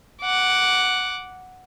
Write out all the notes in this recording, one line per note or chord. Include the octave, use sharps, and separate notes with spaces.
F#5 D6